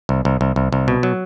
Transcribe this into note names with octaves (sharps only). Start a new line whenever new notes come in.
C2
C2
C2
C2
C2
B2
F#3